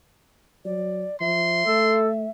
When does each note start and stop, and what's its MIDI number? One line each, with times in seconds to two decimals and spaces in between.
0.65 1.06 54
0.65 1.16 74
1.21 1.65 53
1.21 2.30 76
1.21 1.98 84
1.67 2.27 57
1.67 2.09 69